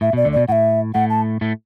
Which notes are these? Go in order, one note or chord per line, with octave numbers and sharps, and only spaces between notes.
A2 E5
B2 D5
D2 D3
B2 D5
A2 E5 F#5
A2 A3 F#5
A5
A2 A3